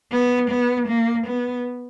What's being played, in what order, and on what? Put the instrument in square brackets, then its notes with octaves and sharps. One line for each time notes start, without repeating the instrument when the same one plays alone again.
[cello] B3
B3
A#3
B3